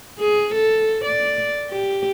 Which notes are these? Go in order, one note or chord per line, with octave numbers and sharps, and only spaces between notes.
G#4
A4
D5
G4